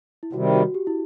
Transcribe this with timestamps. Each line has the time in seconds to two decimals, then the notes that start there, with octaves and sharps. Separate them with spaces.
0.23 E4
0.33 C3 D#3 G3 F#4
0.55 F#4
0.74 G4
0.87 E4